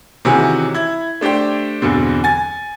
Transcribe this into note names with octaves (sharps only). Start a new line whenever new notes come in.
C3 D#3 E3 C#4 F#4 G#4
E4 G#6
A3 D4 G4 C5 G5
E2 G2 B2 D3 C4
G#5 A6